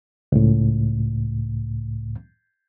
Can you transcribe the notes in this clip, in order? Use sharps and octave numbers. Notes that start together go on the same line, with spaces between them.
C#2 A2